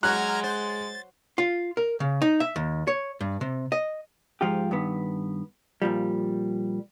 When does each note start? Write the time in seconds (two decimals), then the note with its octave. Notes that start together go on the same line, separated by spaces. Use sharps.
0.03 F#3 G#3 F#4 A#5 F6 F#6 G#6
0.44 C5 A6
1.38 F4
1.77 A#4
2.00 C#3
2.22 D#4
2.40 E5
2.56 D#2
2.87 C#5
3.21 G2
3.41 C3
3.72 D#5
4.41 G#2 F3 F4 G4
4.71 G2 D#3 B3
5.82 A#2 F3 G3